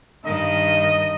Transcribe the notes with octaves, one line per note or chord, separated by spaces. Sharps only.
G2 D#3 D#5